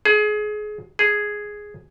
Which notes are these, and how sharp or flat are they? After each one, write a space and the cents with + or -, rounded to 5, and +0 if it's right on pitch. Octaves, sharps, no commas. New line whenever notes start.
G#4 +25
G#4 +0